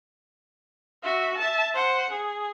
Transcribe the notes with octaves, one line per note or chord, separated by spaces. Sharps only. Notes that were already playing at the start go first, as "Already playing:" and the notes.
F#4 E5
E5 A5
C5 F#5
G#4